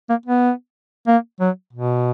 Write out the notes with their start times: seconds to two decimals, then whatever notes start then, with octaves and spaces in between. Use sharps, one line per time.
0.10 A#3
0.26 B3
1.07 A#3
1.40 F#3
1.74 B2